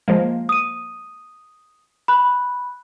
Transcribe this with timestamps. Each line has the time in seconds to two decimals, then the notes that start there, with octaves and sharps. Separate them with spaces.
0.08 F3 G#3 A#3
0.49 D#6 D#7
2.08 B5 F#6